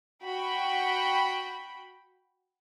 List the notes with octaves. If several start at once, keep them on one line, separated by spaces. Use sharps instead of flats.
F#4 G5 B5